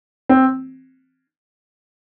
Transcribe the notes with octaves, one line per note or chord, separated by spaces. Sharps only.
C4